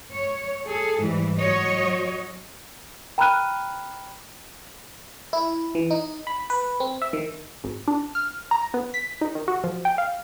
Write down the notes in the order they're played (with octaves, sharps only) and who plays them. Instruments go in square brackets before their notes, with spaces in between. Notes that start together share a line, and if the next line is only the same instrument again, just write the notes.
[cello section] C#5
G#4 A4
G#2 E3 G3
F#3 F#4 C#5 D#5
[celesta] G5 A#5 B5 F6 F#6 D#7
[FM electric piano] E4
E3
D#4
B5
B4
C4
E5
D#3
[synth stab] G#1
D4
F6
A#5
B3
B6
D#4
D#3
F#4
F3
G5
F5